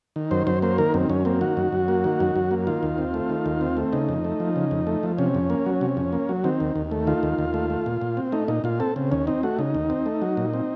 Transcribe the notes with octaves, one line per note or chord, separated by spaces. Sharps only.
D#3
F#2 C5
F#2 C5
A#3 C5
D#3 A#4
F#2 C4
F#2 C#4
A#3 C4
D#3 F#4
F#2
F#2
A#3
D#3
F#2
F#2
A#3
D#3 F4
D#2
C4
A3
D#3
D#2
C4
A3
C#3 D#4
F2
A3
F3
C#3
F2
A3
F3
C3 C#4
F2
A#3
F#3
C3
F2
A#3
F#3
D#3 C4
D#2
D#2
A3
D#3 F4
D#2
D#2
A3
A3
A#2
A#2
C4
A3 D#4
A#2 D#4
A#2 F4
C4 A4
C#3 C4
D#2 C#4
C4 D#4
A3 F#4
C#3 D#4
D#2
C4
A3
F#3
A#2
C4